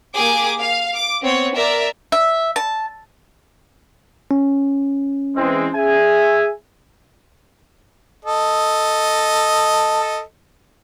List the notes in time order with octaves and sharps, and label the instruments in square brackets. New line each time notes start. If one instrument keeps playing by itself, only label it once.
[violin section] A#3 G4 G#4 G#5 D6
F5
D6
B3 C4 C#5
A#4 D5 E5
[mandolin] E5
A5
[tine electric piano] C#4
[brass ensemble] E3 G#3 C4
G#4 E5 G#5
[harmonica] A4 D#5